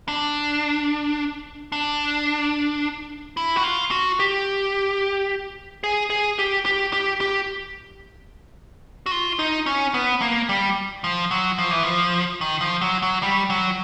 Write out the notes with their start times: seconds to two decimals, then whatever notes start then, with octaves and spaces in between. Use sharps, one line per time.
0.08 D4
1.72 D4
3.37 E4
3.56 F#4
3.64 F4
3.91 F#4
4.20 G4
5.84 G#4
6.10 G#4
6.39 G4
6.66 G4
6.93 G4
7.21 G4
9.06 F#4
9.11 F4
9.39 D#4
9.66 C#4
9.94 B3
10.22 A#3
10.49 G3
11.04 F3
11.31 F#3
11.58 F3
11.71 E3
11.83 F3
12.41 D#3
12.61 F3
12.81 F#3
13.02 F#3
13.23 G3
13.50 F#3